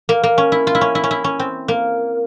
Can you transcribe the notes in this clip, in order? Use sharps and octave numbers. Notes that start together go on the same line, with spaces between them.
A#3
A#3
C#4
E4
F4
E4
C#4
E4
C#4
E4
C#4
C4
A#3